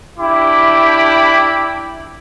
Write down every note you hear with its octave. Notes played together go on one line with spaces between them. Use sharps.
D4 E4 G4 B5 D6